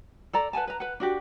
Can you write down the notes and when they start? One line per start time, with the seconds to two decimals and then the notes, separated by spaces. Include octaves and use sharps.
0.33 A4 D5 A#5
0.53 B4 F#5 G#5 A5
0.67 B4 A#5
0.80 B4 F#5
1.00 D4 F#4 G4